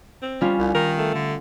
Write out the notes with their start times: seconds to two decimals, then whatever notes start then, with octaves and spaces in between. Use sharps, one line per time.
0.23 C4
0.41 G3 C#4 F4
0.59 C2
0.74 D#3 A#4
0.98 A3
1.14 D3